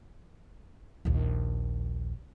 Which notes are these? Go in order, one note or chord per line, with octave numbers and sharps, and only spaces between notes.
A#1 D#2